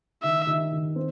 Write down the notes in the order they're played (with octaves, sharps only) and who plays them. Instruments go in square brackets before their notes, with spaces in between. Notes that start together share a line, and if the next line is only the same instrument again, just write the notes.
[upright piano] D#3 [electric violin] E5
[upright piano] D#3
D#3
C4